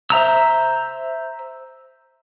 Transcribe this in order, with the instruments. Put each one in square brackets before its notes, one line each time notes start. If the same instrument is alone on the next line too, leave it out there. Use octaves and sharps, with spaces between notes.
[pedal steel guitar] C5 E5 A#5 E6